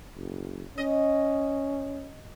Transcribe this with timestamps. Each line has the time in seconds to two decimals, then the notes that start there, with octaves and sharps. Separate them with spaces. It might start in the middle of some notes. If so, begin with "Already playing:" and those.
0.17 F#1
0.78 C#4 D#5